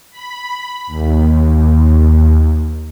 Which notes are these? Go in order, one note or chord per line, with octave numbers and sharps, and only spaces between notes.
B5
D#2